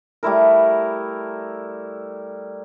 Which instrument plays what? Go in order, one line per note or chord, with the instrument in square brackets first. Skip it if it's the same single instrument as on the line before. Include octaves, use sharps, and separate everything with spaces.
[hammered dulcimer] G3 A3 E4 A#4